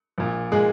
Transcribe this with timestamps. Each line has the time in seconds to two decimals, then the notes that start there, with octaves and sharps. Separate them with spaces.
0.18 A#1 A#2
0.52 A#2 G#3 G#4